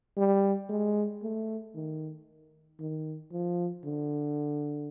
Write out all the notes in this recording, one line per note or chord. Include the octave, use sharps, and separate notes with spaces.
G3
G#3
A3
D#3
D#3
F3
D3